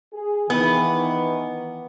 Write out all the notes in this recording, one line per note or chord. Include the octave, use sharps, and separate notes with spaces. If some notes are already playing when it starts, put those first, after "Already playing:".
G#4
D#3 E3 B3